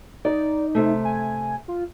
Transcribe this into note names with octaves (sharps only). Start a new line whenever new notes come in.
D#4 D5
C3 A3
G#5
F4